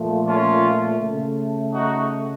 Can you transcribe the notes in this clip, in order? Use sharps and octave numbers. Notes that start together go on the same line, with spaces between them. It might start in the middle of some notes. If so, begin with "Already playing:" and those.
Already playing: A#2 F3 A3
C#4 F4
C#3 A3
D#4 F#4